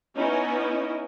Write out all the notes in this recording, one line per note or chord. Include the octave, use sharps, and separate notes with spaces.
B3 C#4 D#4 E4 D#5